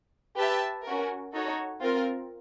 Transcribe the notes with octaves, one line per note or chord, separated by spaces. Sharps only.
G4 B4 E5 A5
C#4 F#4 A#4
D#4 F#4 A4 C#5
C4 F4 A#4